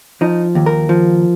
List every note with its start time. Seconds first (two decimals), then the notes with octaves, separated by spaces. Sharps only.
0.21 F3 D#4
0.55 D#2
0.66 A#4
0.89 F3